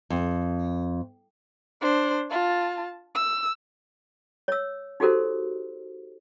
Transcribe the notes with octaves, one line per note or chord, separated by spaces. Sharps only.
F2
D4 C5
F4 A5
E6
C#5 E6
D#4 F#4 G4 A4 A#4 C5